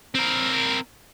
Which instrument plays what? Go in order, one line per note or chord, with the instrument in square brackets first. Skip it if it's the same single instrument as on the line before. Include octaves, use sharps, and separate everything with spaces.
[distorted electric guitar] C4 A#4